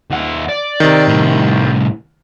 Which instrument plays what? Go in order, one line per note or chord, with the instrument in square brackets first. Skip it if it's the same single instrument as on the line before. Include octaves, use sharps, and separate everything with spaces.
[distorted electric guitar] D#2 F#5
D5
[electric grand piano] C3 D#3
[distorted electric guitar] C2 A2